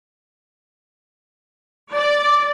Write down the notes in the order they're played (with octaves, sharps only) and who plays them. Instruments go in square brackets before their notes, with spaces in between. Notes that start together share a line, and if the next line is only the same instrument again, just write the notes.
[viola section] D5